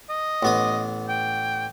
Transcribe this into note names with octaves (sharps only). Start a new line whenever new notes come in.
D#5
A1 B3 D#6
G5